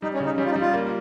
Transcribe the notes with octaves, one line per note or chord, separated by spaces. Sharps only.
G3 D#4
C#4
C#3
D#4
G3 C#4
F4
D#4
G3
F4
A#3